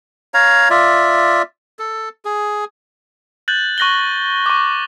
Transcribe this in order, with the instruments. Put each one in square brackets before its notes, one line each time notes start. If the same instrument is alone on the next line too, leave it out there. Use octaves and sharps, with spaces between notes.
[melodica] C#5 F5 A#5
F4 D5 E5
A4
G#4
[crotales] F#6 G6 A6 F#7
C#6 F#6 A#6 F#7 G7
C#6 D6